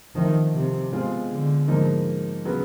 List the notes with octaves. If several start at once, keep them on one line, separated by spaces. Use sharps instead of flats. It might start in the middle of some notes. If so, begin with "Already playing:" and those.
D#3 F3 A3 C4 D#4
C3
B2 G#3 C4 F4 G#4
D3
G#2 F3 A#3 D#4
C#3 F#3 B3